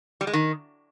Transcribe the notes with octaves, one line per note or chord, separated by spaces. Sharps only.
G3
G#3
D#3